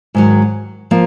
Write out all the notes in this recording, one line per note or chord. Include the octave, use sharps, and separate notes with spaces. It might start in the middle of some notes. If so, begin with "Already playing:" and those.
G#2 D#3 F#3
F3 A#3